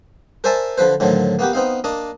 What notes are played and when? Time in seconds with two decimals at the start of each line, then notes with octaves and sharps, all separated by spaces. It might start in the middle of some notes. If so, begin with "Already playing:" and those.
0.44 A#4 C5 D5 E5 G#5 A5
0.78 D3 F3 B4 C5
1.00 A2 D3 D#3 F3 F#3
1.39 A#3 B3 F#4 G4
1.53 B3 C4 D#4 F5
1.84 A#3 D4 D#5